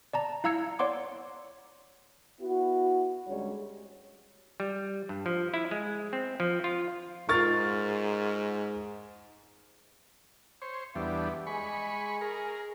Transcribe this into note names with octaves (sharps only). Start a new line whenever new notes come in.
D5 A5 A#5
E4 F5 A#5 E6 G#6 C#7
C#5 D5 F#5 C6 D6
B3 E4 F#4
D2 G3 G#3 C#4 C#5
G3
G2
F3
E4
G#3
C4
F3
F4
G#2 F4 A#4 C#6 F6 A6
C5 C#5
E2 G3 B3 D4 E5
G#3 G#5 B5 C#6
G#4 A#4